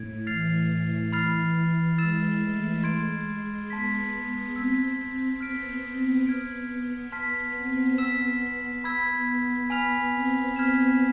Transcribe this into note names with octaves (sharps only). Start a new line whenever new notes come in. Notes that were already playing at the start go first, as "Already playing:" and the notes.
Already playing: A2 G#6 D7
E3 F6 A6 C7 F7
B5 F6 A6 C7 F7
G#3 E6 A6 E7
A3
G#3 C6 G#6 D7
B3 A5 C6 G#6 B6
C4 E6 G#6 B6
B3 F6 B6 D7
B3 F6 G#6 D7
B3 A5 C6 F6 B6
C4
B3 E6 B6 E7
B5 E6 G#6 B6
B3 G#5 B5 F6 B6 F7
C4
B3 F6 G#6 B6 E7